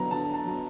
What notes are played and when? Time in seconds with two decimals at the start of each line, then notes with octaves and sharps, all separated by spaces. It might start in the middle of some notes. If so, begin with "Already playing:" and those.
Already playing: D3 F#3 B3 A#5
0.11 D3 A5
0.34 A5
0.45 F#3 B3